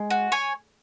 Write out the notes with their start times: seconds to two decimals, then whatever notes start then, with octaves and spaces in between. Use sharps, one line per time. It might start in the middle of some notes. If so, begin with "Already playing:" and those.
Already playing: G#3
0.10 F#4
0.32 C#5 G#5